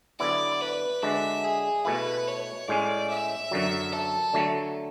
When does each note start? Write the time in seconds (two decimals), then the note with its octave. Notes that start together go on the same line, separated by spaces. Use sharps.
0.19 D3 F#3 B3 E4 D5
0.62 B4
1.03 D3 G#3 D4 F#4 E5
1.44 G#4
1.85 B2 A3 E4 B4
2.27 C#5
2.68 A2 G#3 C#4 D5
3.10 E5
3.51 F#2 D3 F#3
3.93 A4
4.34 D3 F#3 A3